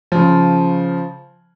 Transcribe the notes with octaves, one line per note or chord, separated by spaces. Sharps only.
C#3 F3